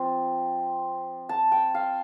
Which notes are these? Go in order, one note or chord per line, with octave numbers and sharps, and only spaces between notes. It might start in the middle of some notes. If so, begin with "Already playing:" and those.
Already playing: F3 C4 F4
A5
G5
F5